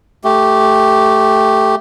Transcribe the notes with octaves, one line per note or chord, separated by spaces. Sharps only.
A3 G4